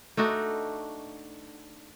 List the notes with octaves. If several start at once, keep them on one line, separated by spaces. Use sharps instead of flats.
A3 D4 D#4 F#4